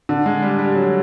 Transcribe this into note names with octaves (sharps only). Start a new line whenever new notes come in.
D3
G#3
G3
G3
F#3